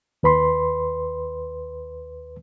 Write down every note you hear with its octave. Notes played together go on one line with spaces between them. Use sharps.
D#2 B4 B5 C6